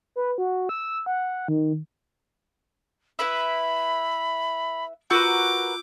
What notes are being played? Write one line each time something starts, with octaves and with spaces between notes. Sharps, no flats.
B4
F#4
E6
F#5
D#3
E4 B4 E5 B5
F4 F#4 A#4 B4 D6 E6 G6